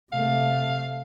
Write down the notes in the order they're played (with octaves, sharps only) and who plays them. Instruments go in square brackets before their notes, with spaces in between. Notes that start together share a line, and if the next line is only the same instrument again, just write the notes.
[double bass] C3 A3 [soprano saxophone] F5